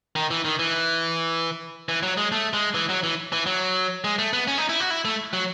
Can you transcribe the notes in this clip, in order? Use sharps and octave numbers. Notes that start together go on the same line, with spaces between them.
D#3
E3
D#3
E3
E3
F#3
G#3
A3
G#3
E3
F#3
E3
E3
F#3
G#3
A3
B3
C#4
D#4
E4
F#4
E4
A3
F#3